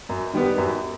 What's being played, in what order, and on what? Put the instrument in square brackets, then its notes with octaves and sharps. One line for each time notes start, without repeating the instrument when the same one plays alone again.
[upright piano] F#2
D#3 G3 B3
F#2